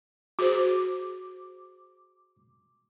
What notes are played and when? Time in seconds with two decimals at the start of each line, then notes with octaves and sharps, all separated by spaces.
0.39 F#4 G#4 C5 D6